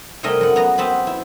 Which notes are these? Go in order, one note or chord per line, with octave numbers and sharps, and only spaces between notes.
C3 G3 A3 A#4 D#5 G#5
F#2 F#5
B3 A#5
B3 C4 A5 B5
E4